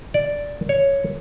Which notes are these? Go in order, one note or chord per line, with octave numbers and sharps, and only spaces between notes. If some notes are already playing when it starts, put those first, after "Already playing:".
D5
C#5